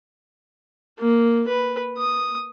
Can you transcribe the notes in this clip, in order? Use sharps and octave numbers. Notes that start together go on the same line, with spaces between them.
A#3
B4
D#6